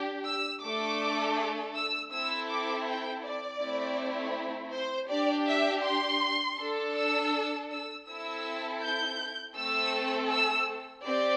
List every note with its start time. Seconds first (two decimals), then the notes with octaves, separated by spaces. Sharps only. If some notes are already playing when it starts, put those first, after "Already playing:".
Already playing: D4 G4
0.27 E6
0.63 A3 D4 A4 D6
1.75 E6
2.12 C4 E4 A4 E6
2.49 D6
2.86 G5
3.23 D5
3.61 A3 C4 E4
4.72 C5
5.10 D4 G4 D5
5.47 E5
5.84 C6
6.58 D4 A4
6.96 E6
7.70 E6
8.07 C4 E4 A4 E6
8.82 G6
9.56 A3 C4 A4 E6
10.31 E6
11.05 C4 G4 D5